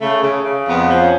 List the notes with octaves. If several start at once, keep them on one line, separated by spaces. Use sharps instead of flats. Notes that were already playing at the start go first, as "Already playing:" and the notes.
C#3 A3
C#3
C#3
F2 B3
F3
C#4